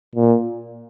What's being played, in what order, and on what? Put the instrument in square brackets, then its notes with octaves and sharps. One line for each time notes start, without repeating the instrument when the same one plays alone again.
[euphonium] A#2